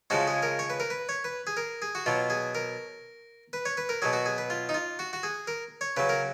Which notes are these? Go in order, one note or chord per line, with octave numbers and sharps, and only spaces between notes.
C#3 F3 G#3 F#4
G#4
A#4
C#5
B4
A#4
B4
C#5
B4
G#4
A#4
G#4
F#4
B2 F#3 F4
G#4
A#4
B4
C#5
B4
A#4
B2 F#3 G#4
F#4
G#4
B4
F4
D#4
F4
F#4
F#4
G#4
A#4
C#5
C#3 F#3 B4
A#4